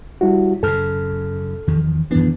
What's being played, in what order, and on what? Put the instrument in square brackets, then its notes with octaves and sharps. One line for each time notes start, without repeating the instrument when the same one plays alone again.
[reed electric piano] G3 E4 F#4
[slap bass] F#2 C#3 [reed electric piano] A4 F6
[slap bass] E2 D#3 F3
[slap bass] F#2 D4 [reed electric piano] D#3 E3 B3